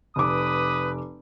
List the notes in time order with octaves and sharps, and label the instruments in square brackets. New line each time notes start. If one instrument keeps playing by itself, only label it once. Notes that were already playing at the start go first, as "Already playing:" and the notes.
[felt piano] F1 D6 [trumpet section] B4 D#6